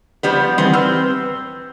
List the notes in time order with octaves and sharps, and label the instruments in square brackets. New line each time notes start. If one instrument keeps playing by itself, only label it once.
[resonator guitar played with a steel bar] F3 G3 B3
[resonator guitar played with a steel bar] D#3 B3 C4 [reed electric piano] E3 G3 C6
[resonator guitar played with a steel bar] C4 [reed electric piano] B4 E6 F6